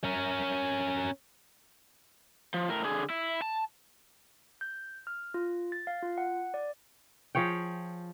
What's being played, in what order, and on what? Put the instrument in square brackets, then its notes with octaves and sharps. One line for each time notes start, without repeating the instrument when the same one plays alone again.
[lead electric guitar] C#4 A#4
[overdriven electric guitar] F3
A2 A#4
D3 G#4
E4
A5
[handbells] G6
F6
F4
A6
F5
F4
F#5
D5
[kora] F3 G#4 C#5 G5